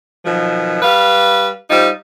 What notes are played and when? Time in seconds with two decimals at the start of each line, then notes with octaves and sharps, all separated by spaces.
0.25 B2 D#3 F3 F#3
0.82 G3 B4 F5
1.70 G3 D#4 F4 C5